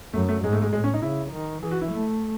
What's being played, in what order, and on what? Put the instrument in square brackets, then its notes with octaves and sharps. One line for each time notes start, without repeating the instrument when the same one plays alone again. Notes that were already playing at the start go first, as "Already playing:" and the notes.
[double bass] F#2 [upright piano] A3
[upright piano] A3
[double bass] G#2 [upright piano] G#3
[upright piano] A3
G#3
[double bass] A2 [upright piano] G#3
[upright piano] C#4
D#4
[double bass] C#3 [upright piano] E4
[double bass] D#3
[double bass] E3 [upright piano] G#4
[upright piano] F#4
E4
[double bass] A3